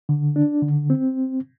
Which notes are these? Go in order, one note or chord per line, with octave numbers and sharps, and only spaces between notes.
D3
D4
D3
C4